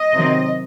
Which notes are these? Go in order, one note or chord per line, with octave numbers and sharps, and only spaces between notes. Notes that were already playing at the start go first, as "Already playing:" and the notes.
Already playing: D#5
C3 D#3 F#3 C4